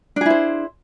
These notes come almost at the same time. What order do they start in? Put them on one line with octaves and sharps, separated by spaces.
D4 G#4 E4 C5